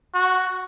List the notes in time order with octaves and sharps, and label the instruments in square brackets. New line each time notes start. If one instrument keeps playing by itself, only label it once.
[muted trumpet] F#4